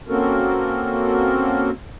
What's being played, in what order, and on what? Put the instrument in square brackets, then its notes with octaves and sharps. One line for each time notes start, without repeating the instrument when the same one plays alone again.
[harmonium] A#3 C4 C#4 F#4 A4 A#4